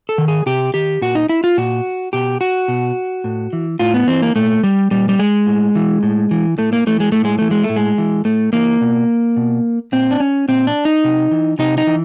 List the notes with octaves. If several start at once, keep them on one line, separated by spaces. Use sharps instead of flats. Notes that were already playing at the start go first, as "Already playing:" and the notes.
A4
D#3
G#4
C3 G4
D#3 G4
A#2 F#4
D#4
E4
F4
A#2 F#4
B2 G4
F#4
B2
A2
E3
A2 F4
B3
E3 C4
A#3
A#2 A3
G3
A#2 G3
G3
G#3
A2
E3
A2
E3
A2 A3
A#3
E3 A3
G#3
A2 A3
G#3
E3 A3
G#3
A3
A2
G#3
E3
A2 A3
E3 A#3
B2
B2
A#2 C4
D4
C#4
A#2 C4
D4
D#4
C3
E3
C3 D#4
D#4
E3